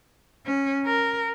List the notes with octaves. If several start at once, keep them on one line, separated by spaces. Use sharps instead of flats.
C#4
A#4